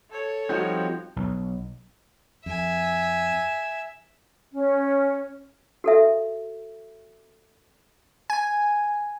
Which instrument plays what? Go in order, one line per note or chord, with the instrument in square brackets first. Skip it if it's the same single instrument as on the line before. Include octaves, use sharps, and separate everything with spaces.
[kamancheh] A4 C#5
[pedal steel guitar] F3 C4 [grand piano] G3 D#4 F#4
[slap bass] B1
[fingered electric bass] F2 [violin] E5 G#5
[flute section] C#4
[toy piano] F#4 A4 E5
[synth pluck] G#5